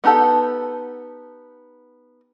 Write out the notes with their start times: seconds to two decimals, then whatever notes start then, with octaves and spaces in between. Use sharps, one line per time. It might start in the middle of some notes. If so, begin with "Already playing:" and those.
0.04 B3 D#4 G4 A4 F#5